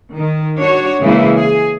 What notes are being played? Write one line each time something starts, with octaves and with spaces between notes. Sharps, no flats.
D#3
D4 F#4 C#5
C#3 E3 G#3 A#3 E4 G#4
G#4